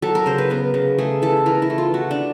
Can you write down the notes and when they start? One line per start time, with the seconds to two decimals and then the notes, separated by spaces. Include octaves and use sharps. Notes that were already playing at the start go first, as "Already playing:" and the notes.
0.02 F#3 A4
0.15 A#4
0.26 C#3 C5
0.38 B4
0.50 B3 A#4
0.74 C#3
0.98 A3 G#4
1.22 E3 A4
1.46 E3 A#4
1.62 E4
1.70 A3
1.78 F4
1.94 A3 F#4
2.11 D4